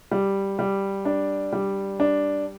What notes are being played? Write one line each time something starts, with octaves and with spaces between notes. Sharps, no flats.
G3
G3
D4
G3
D4